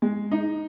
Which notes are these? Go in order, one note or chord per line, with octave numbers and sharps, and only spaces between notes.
G#3
D#4